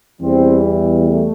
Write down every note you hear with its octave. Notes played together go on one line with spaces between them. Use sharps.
E2 E3 G3 C4
A3